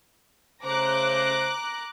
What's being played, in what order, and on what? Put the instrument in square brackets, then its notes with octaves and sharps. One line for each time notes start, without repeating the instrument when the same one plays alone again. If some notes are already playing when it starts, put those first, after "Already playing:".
[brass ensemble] C#3 A3 C5 [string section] A#5 D6 F#6